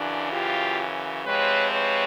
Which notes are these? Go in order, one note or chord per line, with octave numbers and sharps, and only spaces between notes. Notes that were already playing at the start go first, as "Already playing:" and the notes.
Already playing: F#2 C#3 E3 D4
F4 G4
C3 F3 G#3 C4 B4 C#5
B4 C#5